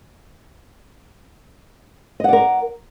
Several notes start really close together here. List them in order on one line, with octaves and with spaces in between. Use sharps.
D#5 F#5 D5 A#4